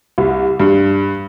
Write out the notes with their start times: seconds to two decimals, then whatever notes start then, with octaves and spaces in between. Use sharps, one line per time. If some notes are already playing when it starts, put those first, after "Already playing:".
0.18 C2
0.60 G2